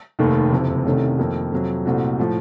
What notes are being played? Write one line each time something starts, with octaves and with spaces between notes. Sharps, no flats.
F1 D#2 D#3 A3
F#1 F2 C3
C2 C3 D#3 A3 C#4
F2 D#3 A#3
F2 C3 F#3
C2 A#2 A3 C4 F#4
A2 F3